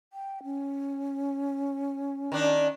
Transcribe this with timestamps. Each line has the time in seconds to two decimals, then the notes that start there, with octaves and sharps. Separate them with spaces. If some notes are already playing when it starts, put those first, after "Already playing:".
0.13 G5
0.44 C#4
2.32 D#3 D4